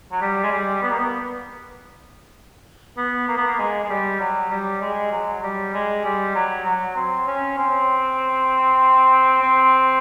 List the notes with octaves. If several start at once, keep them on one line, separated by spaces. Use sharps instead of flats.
F#3
G3
G#3
G3
B3
A#3
B3
B3
A#3
B3
A#3
G#3
G#3
G3
F#3
G3
G#3
F#3
G3
G#3
G3
F#3
F#3
C4
C#4
C4
C4